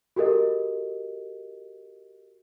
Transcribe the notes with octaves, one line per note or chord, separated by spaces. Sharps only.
F#4 G4 A4 A#4 D#5